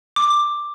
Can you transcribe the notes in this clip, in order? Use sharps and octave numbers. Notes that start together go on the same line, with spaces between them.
D6